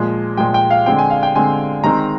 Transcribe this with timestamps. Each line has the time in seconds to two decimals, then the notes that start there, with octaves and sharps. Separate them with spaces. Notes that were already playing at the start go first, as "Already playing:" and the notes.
Already playing: A#2 F3 G#3
0.37 A#2 F3 G#3 G5
0.54 G5
0.71 F5
0.86 D3 G#3 C4 G5
0.99 G#5
1.10 F5
1.23 G5
1.35 D3 G#3 C4 G#5
1.84 D#3 G#3 C4 A#5